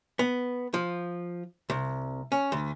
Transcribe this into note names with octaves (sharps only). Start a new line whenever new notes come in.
B3
F3
C2
C#4
D2